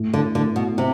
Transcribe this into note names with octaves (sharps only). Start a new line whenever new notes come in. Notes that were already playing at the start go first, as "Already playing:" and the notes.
Already playing: A2
D3
A2 D3
B2
C3 C4